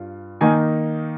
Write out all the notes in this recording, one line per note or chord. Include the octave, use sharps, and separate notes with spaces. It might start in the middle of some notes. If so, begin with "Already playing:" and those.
Already playing: G2 F4
D#3 A#3 D#4 G#5